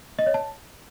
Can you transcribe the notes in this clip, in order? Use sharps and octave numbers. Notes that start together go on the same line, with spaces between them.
D#5
C#5
A5